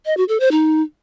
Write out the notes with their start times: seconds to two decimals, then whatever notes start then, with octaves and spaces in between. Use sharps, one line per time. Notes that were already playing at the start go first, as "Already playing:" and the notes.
0.06 D#5
0.17 F#4
0.29 A4
0.40 C5
0.52 D#4